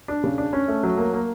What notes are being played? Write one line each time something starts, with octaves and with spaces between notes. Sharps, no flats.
D4
C#3
D4
C#4
A3
F#3
A#3
A#3